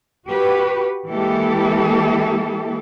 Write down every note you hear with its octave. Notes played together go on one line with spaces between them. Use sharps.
F#4 G4 B4
E3 G#3 A#3 E4 G4 A4